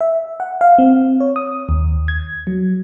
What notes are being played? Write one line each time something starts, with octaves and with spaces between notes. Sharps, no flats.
E5
F#5
F5
C4
C#5
D#6
D#2
G#6
F#3